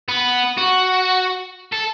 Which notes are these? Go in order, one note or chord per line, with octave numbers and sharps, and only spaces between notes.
B3
F#4
A4